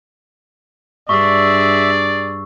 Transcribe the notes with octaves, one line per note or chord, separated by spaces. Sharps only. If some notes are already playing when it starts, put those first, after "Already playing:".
G2 D4 G#4 D5 E5 C#6 E6